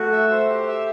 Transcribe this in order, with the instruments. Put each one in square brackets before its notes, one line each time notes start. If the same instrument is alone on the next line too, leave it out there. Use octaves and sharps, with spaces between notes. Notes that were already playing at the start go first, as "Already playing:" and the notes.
Already playing: [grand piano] A3 [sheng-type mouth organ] F#4
[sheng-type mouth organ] E5
C5
G4
E5